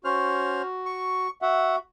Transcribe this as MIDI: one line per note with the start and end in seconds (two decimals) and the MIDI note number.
0.04 0.62 61
0.04 1.27 66
0.04 0.62 72
0.04 0.62 89
0.86 1.30 85
1.42 1.79 66
1.42 1.76 76
1.42 1.76 78